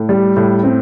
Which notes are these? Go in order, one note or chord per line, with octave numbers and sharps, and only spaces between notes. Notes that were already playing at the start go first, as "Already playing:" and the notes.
Already playing: A2
G3
A2
C4